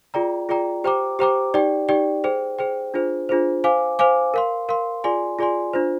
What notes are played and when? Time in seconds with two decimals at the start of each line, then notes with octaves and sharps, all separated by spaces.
0.14 F4 G#4 D5 G5 A#5
0.49 F4 G#4 D5 G5 A#5
0.84 G4 C5 G5 A#5 D6
1.19 G4 C5 G5 A#5 D6
1.54 D#4 G4 D5 G5
1.89 D#4 G4 D5 G5
2.24 G#4 C5 G5
2.59 G#4 C5 G5
2.94 D4 F4 G#4 C5
3.29 D4 F4 G#4 C5
3.64 C5 F5 G#5 D6
3.99 C5 F5 G#5 D6
4.34 A#4 F5 C6
4.69 A#4 F5 C6
5.04 F4 G#4 D5 G#5 C6
5.39 F4 G#4 D5 G#5 C6
5.73 D4 F4 C5